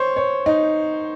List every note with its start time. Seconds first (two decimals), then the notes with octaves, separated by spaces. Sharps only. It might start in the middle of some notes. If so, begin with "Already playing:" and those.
Already playing: C5 C#5
0.17 C#5
0.46 D#4